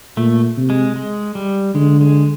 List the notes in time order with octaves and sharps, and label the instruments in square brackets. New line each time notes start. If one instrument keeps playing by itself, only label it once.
[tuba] A#2 [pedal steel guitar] A3
[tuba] C3
[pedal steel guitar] G#3
G#3
G3
[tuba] D3 [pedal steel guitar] G#3
[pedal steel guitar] G#3